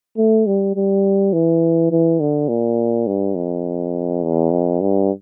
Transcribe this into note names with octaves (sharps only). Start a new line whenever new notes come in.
A3
G3
G3
E3
E3
D3
A#2
G2
F2
E2
F2
G2